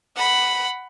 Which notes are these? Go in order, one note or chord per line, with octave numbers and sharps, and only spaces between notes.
F#5 B5